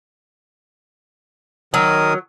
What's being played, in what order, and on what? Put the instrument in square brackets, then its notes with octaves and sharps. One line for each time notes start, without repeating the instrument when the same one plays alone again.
[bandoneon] D#3 A#4 D#6 [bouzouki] F#3